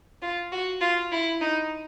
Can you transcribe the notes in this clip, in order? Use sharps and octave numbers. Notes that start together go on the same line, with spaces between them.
F4
F#4
F4
E4
D#4